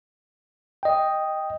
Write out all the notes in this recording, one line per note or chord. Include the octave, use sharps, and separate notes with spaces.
D#5 G5